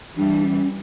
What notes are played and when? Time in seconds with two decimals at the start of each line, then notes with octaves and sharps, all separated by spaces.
0.16 E3 G3 D4
0.44 C#4